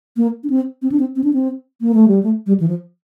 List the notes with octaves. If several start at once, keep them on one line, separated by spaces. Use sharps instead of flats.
A#3
D4
C4
C4
D4
C4
C4
D4
C4
A#3
A3
G3
A3
G3
E3
F3